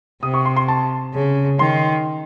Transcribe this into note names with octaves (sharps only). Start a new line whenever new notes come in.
C3 D#6
C#6
C6
C6
A5
C#3
D#3 C6